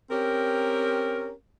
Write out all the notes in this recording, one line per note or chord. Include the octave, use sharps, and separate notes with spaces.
C4 C#4 G4 A#4